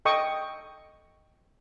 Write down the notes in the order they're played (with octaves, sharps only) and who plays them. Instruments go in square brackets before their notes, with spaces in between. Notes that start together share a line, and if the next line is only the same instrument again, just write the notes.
[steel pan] A4 D#5 G5 C#6 D#6